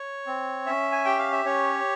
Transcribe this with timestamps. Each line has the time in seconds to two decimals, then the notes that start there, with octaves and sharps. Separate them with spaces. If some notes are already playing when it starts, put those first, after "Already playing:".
Already playing: C#5
0.27 C4
0.66 C#4 E5
0.92 G#5
1.05 G4 G5
1.19 F5
1.32 E5
1.45 C#4 C#5